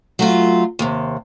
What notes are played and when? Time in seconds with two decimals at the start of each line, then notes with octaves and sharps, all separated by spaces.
0.19 F#3 A3 F4
0.79 D#2 C3